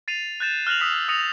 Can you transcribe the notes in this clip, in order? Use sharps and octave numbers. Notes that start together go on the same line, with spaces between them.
A6 C7 D#7 F7
F#6 G6 A6 E7
F6 F#6 A#6 F7 F#7
D#6 E6 F#6 B6 D#7
D#6 E6 A#6 C#7 D#7 F7